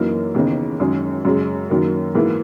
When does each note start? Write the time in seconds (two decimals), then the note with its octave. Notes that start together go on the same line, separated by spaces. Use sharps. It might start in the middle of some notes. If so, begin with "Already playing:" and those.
Already playing: F#2 E3 A#3 D#4 A#4
0.35 D#2 C#3 E3 B3 D#4
0.80 F#2 D#3 G#3 C#4 G#4
1.25 F#2 C#3 G#3
1.70 F#2 D#3 F#3 A#3
2.15 G#2 E3 A#3 E4